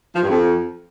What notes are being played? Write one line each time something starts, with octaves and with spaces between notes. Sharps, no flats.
F3
G2
F2